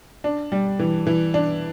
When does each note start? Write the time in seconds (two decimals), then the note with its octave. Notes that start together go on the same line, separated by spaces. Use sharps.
0.24 D4
0.52 G3
0.79 E3
1.07 E3
1.34 D4